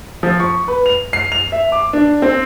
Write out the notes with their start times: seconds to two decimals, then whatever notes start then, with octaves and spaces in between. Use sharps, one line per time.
0.23 F3
0.40 C#6
0.68 B4
0.86 F7
1.13 C7
1.32 F7
1.52 E5
1.72 D6
1.93 D4
2.22 C4